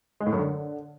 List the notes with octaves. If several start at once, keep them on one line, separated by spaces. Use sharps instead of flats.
G#3
A2
F#2
D3